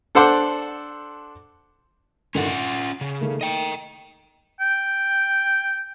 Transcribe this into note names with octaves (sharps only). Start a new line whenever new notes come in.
D4 A4 C5 F#5 C6 D6
G2 D3 D#3 C#4 F4 F#5
D7
C#3
D#3 A3 A#3
D#5 G5
G5